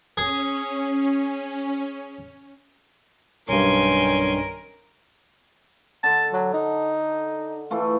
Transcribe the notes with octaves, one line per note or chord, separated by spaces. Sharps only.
C#4 G#4
B1 G2 D#3 C#4 A#4 G#5 C6
D3 A5
F#3
D#4
E3 A3 F4